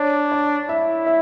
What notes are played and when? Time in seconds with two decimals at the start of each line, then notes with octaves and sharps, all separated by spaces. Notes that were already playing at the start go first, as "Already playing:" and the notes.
Already playing: D4 C#5
0.32 D5
0.69 E4 E5
1.07 E5